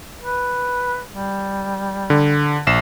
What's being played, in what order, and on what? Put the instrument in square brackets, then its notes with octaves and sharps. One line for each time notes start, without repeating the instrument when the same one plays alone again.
[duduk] B4
G3
[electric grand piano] D3
A#1 C7 E7